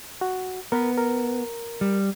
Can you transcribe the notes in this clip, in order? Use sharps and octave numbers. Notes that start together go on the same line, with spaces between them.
F#4
B3 A#4 B4 B5
A#4
G3